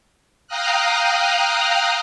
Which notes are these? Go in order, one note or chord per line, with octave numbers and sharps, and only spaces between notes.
F5 G5 A#5 D#6 F6 F#6